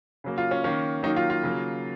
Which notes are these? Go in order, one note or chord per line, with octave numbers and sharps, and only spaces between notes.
C#3 F#3 A#3
F4
C#4
D#3 A#3 C#4
D#3 F#3 A#3 D#4
F4
F4
C#3 F#3 A#3